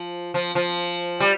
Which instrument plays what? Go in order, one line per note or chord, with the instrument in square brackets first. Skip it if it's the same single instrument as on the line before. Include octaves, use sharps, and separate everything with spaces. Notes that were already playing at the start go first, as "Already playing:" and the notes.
Already playing: [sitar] F3
F3
F3
G3